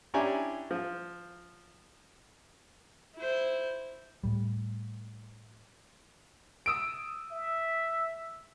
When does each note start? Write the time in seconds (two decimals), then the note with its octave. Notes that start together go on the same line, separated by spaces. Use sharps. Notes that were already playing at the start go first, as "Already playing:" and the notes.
0.14 C#4 D4 E4 G4 G#5 A#5
0.71 F3
3.17 E4 C5
4.24 A2 G3
6.66 D#6 E6 D7
7.32 E5